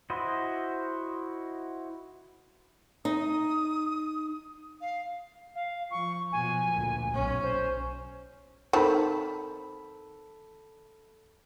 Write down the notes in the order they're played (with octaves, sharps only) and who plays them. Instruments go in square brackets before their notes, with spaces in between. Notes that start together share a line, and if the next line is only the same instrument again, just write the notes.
[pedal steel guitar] E4 F#4 C5 D#5
[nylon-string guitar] D#4 [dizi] D#6
[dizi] F5
[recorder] F5
[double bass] F3 [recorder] C#6
[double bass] B2 F3 [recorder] G#5
[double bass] D2 A#2
B1 C#4
[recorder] C5
[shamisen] D#3 C4 A5 [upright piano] A4 B5